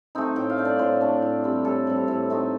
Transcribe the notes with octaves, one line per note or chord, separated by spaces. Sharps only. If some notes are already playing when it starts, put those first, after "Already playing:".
A3 C4 D#4
A2 G5
F5
A3 D4
D5
A2 C5
A3 D4
A2
G3 C4
A2 A4
G3 C4
A2
A3 C4 D#4